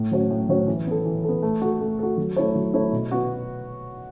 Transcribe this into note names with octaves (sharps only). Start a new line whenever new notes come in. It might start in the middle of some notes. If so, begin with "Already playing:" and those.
Already playing: A2
F#3 C#4 F#4 C#5
A2
F#3 C#4 F#4 C#5
E3
B3 A4
E3
B3 A4
A3
F#4 A4
A3
F#4 A4
F#3
A3 E4 C#5
F#3
A3 E4 C#5
B2
B3 F#4